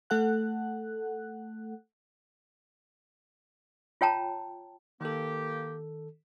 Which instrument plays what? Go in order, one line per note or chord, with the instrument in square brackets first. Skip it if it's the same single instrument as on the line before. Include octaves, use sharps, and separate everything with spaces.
[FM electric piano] A3 A4 F#5 F#6
[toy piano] F4 C#5 G5 A5 A#5
[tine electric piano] D#3 A4 [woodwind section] A#3 G4